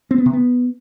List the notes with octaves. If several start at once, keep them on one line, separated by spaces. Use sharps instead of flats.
C4
B3
C3
B3